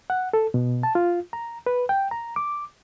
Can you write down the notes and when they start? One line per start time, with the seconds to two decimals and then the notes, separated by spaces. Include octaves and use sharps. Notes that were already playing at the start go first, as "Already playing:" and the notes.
0.10 F#5
0.33 A4
0.54 B2
0.83 A5
0.95 F4
1.33 A#5
1.66 B4
1.89 G5
2.11 A#5
2.36 D6